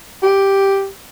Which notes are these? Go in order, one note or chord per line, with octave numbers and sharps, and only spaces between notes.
G4